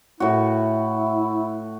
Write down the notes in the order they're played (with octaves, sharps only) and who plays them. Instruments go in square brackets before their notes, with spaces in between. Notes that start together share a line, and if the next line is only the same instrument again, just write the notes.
[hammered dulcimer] A2 F#4 [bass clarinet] E4